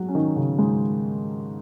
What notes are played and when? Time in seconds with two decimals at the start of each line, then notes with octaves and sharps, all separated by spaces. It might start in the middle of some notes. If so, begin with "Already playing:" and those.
Already playing: F#3 G#3 F#4
0.09 C#4
0.15 D#3 D#4
0.36 C#3
0.58 G#2 G#3